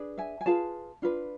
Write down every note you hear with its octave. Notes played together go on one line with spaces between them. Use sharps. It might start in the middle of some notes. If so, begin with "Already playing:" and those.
Already playing: D4 G#4 B4
E5 G#5
G#5
F4 G#4 B4 F5 A5
D4 F4 B4